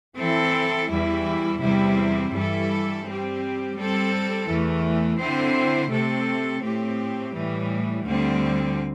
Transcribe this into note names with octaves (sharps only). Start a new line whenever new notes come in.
E3 C4 E4 A4
E2 E3 G3 E4
E2 C3 G3 C4 E4
G2 E3 G3 E4 A4
G3 C4 G4
G3 C4 A4
E2 E3 A3
D3 C4 E4 C5
C3 A3 C4 A4
A2 A3 C4 G4
A2 E3 G3
D2 D3 G3 C4